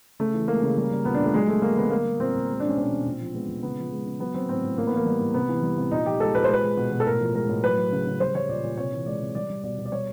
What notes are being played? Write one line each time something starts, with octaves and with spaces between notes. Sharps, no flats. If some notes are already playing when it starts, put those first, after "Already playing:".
C#3 A3
E3
G#3 A#3
C#3
G3
G3
A#2 B3
D4
A#2
A3
F#3 G#3
F#3 A3
D3 A#3
D3 B3
G3 A#3
G3
A#2 C4
A#2
G#3
G#3 D4
C#4
B2 C4
B2
A#2
F3
G#3 B3
A#2
C#3 B3
F3
G#3
C#3
F#3 B3
F#3 C4
A2 C4
A2
A2 A#3
B3
E3 A#3
G3
A2
C3 B3
E3
G3
C3
A#2 D#4
F3 G4
G#3 A4
A#2 B4
C5
G#3 B4
G#3
B2
B2
A4
A2 A#4
F3
G#3 A#4
A2
F#3 B4
F#3
C#3
C#3
G3 C5
G3 C#5
A#2 D5
A#2
C3 C#5
E3
G#3 D5
C3
G3 D5
G3
B2 D5
B2
D5
G3 C#5